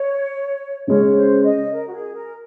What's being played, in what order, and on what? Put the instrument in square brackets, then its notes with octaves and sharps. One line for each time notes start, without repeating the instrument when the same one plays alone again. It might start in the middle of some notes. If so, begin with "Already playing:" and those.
Already playing: [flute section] C#5
[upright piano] C#3 G#3 C#4 [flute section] C#5
[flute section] C5
D#5
A#4
F#4
G#4
A#4